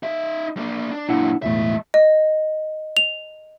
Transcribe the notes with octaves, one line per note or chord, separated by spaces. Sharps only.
D#4 E5
A#3 D4
D4
F#2 A#2 D4 E4 F#5
B1 E2 A2 G#3 E5
D#5
F7